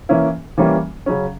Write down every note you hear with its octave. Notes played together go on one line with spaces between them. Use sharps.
E3 A#3 C#4 E4
E3 G3 A#3 C#4 E4
C#3 F#3 C#4